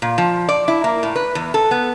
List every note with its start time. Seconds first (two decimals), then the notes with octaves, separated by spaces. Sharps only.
0.02 A#2
0.18 F3
0.49 D5
0.68 E4
0.84 A#3
1.03 A2
1.16 B4
1.35 E2
1.54 A4
1.71 B3